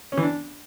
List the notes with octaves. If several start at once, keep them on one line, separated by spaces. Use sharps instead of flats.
C#4
E3
D4